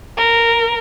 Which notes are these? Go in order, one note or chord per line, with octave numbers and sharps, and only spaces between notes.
A#4